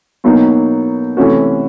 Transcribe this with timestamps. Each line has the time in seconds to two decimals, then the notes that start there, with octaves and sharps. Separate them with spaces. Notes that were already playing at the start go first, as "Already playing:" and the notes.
0.24 B2 F#3 A#3 D#4
1.17 C3 E3 A3 C#4 F#4